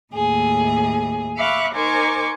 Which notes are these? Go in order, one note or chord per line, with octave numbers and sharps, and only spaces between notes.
D#2 A2 G#4
E5 F5 B5 C#6 D6 F#6
D#4 A#4 C5 G#5 C#6 D6